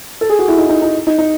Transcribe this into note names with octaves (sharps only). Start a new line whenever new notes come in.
A4
G#4
F#4
E4
D#4
D#4
D#4
D#4
D#4